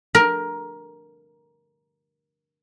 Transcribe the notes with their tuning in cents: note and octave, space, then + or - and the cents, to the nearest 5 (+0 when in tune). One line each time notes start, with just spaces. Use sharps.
A#4 +15